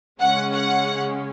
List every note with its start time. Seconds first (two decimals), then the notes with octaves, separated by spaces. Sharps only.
0.20 C#3 G#3 C#4 F#5
0.53 F#5